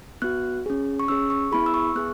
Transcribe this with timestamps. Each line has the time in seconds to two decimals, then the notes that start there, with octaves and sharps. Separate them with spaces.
0.22 B3 F#4 F#6
0.66 C#4 G#4
1.00 C#6
1.08 C#4 G#4 E6
1.30 C#6
1.52 B3 E4 G#4 B5
1.66 E6
1.74 C#6
1.95 B3 G#4 F#6